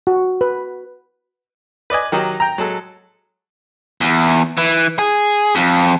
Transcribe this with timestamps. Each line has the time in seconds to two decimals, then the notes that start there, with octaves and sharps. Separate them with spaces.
0.07 F#4
0.41 B4
1.90 B4 D5 D#5 G#5
2.12 D#3 F#3 D#4 G4
2.40 G5 A#5
2.58 F#3 G#3 A4
4.01 E2
4.58 E3
4.99 G#4
5.55 F2